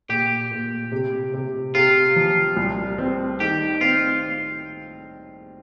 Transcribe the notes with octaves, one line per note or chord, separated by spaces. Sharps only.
A#2 G4
A#2
C3
C3
C3 F4
F3
C2
C4
D#3 G4
C4 F4